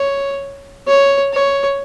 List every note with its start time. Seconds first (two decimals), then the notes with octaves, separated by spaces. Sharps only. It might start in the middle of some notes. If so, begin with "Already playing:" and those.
Already playing: C#5
0.87 C#5
1.33 C#5